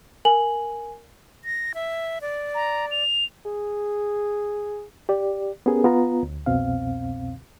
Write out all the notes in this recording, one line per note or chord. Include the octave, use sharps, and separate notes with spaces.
A#4 G#5 F#7
A#6
E5
D5
A#5
F7
G#4
G4 D5
B3 C#4 G4 G#4 A#4
B3 F4 A#5
D2
C2 F2 B2 C4 F5